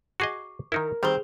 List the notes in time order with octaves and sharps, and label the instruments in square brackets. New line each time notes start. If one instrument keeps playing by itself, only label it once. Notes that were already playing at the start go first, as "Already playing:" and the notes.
[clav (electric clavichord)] F#4 G#4 D#5 [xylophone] C#6 D6 C7
[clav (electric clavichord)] D#3 D#4 E4 [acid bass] A#4
[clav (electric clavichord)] D#3 G3 [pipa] C4 [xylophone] G#4 G7